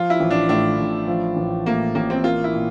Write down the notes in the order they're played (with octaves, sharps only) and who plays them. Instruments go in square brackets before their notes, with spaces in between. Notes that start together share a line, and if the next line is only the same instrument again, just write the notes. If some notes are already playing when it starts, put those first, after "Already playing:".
Already playing: [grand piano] F3 [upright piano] F4
[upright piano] E4
[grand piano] A1
[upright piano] D4
[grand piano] A2 [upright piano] D4
[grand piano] A1
F3
A1
[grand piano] A2 [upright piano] A#3
[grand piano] A1 [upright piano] A#3
[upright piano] C4
[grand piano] A#3 [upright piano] F4
[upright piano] E4
[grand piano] A#2